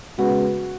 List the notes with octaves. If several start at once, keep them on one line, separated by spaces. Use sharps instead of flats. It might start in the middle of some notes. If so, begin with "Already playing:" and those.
C#3 G#3 B3 F#4